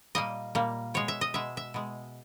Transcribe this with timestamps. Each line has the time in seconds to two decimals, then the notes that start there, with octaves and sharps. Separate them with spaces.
0.15 A#2 G3 A#3 D#5
0.55 A#2 G3 A#3
0.94 B2 G#3 C#5
1.08 E5
1.21 D#5
1.34 B2 G#3 E5
1.57 E5
1.74 B2 G#3